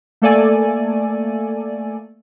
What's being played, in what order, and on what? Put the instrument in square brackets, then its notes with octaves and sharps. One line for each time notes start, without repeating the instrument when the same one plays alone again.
[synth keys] A3 A#3 A4 D5 G#5